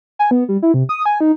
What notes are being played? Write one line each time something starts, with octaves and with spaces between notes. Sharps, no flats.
G#5
B3
G3
E4
C3
D#6
G#5
D#4